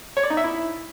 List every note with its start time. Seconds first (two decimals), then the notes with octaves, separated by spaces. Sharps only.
0.17 C#5
0.23 D5
0.30 D#4
0.37 E5
0.44 E4